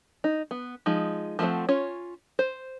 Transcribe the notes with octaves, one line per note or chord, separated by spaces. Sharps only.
D#4
B3
F3 G#3 D#4
F3 A3 B3 C4 F#5
C#4 F4 C#5
C5